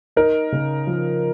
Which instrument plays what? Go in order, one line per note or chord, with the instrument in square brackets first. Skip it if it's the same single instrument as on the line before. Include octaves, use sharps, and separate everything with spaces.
[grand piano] D#4 A#4
C#3
F3